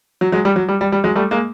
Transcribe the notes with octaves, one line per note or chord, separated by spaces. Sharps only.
F#3
F#3 G#3
G3
F#3
G3
G3
G3
F#3 G#3
G3 A3
G#3 A#3